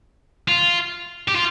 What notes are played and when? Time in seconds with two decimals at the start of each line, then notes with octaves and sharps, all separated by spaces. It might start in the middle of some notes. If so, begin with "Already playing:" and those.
0.48 F4
1.28 G4
1.35 F4